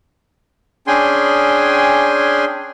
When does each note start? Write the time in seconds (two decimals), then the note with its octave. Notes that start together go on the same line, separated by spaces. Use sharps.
0.87 C#4 D4 G#4 G5 G#5 C6